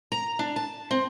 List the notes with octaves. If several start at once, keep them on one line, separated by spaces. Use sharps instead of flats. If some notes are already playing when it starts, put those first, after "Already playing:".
A#5
D4
A5
C4